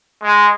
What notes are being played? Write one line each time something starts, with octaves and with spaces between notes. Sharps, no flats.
G#3